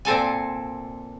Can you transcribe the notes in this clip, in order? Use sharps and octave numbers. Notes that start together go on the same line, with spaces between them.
A#2 C4 A4 G#5